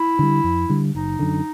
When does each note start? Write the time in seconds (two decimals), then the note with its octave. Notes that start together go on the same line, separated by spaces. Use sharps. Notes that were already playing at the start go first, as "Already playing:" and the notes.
Already playing: E4
0.19 D3 G3
0.44 F2
0.69 D3 G3
0.94 F#1 D#4
1.19 F#2 D3